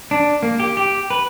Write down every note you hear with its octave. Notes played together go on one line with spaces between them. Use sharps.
D4
A#3
G4
G4
B4